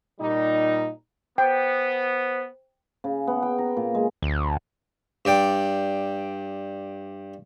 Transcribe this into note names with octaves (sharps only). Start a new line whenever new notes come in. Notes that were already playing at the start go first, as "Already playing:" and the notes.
A#2 G3 D#4
B3 C5 G5
C#3
B3
G5
A#5
A#2
G#3
D2
G2 D5 G5 D6